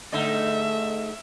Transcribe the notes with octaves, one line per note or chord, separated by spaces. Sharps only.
G#2 D3 A3 D#4 E5